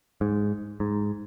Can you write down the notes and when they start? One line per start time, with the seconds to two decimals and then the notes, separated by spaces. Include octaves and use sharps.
0.21 G#2
0.80 G#2